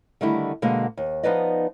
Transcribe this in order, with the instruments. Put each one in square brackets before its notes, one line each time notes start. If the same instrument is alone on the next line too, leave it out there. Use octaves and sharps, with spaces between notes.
[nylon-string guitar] D3 D#3 G3 A3 D4 E4
B2 D3 G#3 A#3
D#2
F3 B3 D#4 B4 D5 D#5